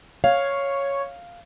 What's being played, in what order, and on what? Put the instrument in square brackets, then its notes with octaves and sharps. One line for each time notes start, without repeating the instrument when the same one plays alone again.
[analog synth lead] C#5 [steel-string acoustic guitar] F5